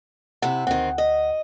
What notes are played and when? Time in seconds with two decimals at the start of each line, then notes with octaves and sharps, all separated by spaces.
0.42 C3 E4 F#5
0.67 D2 D#3 C4 F#5
0.98 D#5